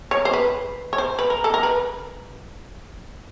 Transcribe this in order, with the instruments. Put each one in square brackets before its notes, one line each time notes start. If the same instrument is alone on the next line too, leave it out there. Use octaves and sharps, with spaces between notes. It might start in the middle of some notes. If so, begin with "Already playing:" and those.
[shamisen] C#5
C5
B4
C#5
C5
B4
A#4
A4
A#4
B4